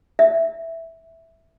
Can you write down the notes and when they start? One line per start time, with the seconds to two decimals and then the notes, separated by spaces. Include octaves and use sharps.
0.19 E5